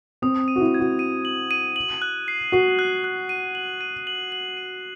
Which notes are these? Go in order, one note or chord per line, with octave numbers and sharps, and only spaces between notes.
C4 D#6
D#7
F#4
E4
G#6
F#4
D#7
F#7
D#7
F#7
F#6
C7
F#4 C7
F#6
F#6
D#7
F#7
D#7
F#7
F#7
D#7